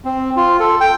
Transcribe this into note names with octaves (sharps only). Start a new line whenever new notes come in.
C4
F4
A4
G5